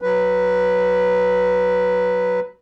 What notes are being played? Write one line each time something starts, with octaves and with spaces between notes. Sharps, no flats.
F#3 B4